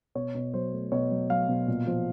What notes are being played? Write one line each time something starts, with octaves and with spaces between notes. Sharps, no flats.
B2 C#5
B2
F#3 C5
A3
B2 C#5
F#3
F#3 F5
B2
A#2
F3